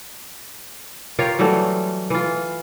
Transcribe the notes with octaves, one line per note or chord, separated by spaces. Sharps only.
F4 G4 A#4 C#5
E3 F#3 G3 A3
E3 F4